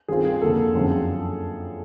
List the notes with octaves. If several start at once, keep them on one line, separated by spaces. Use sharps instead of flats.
D#3 G3 C4 F4 G#4
G#4
F2 D3 F3 A#3 A4
F#2 D3 F3 G#3 C4